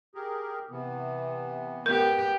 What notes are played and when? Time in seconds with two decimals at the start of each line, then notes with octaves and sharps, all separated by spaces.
0.15 G4 G#4 A#4
0.70 C3 E3 B3
1.86 B3 G4 A#4